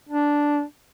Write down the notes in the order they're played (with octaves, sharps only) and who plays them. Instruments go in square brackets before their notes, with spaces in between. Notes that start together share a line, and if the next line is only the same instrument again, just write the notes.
[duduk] D4